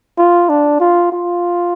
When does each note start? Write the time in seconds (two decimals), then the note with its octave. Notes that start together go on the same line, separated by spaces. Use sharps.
0.18 F4
0.49 D4
0.80 F4
1.12 F4